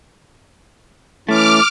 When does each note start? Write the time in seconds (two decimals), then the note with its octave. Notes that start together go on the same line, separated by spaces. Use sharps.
1.29 E3 A3 C#4 E4 D6 F6